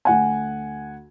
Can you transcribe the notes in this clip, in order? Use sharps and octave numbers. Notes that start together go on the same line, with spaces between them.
D2 F#5 G#5